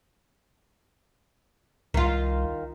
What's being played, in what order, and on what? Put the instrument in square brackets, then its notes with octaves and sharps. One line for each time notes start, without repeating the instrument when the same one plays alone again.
[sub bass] C2 [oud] D#3 F4